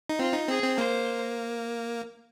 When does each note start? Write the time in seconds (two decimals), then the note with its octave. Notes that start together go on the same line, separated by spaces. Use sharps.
0.09 D#4
0.19 C4 F4
0.33 D#4
0.48 C4 G#4
0.63 C4
0.78 A#3 C5